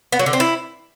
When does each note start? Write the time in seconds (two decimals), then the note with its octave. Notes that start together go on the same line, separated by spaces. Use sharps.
0.12 B3
0.19 F#3
0.26 D3
0.33 C4
0.40 E4